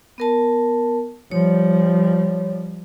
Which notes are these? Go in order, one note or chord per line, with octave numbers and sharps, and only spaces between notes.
B3 A#4 A5
F3 G3 C#5